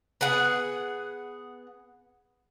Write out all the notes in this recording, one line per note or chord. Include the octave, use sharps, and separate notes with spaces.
B3 G#4 F#5